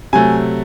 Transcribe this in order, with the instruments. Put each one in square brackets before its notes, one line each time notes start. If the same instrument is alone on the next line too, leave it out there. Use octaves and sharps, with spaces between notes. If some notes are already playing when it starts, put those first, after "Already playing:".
[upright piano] C3 F#3 A3 G#5